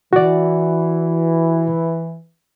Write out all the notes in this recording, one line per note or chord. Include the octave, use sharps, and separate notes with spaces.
E3 F#4 D5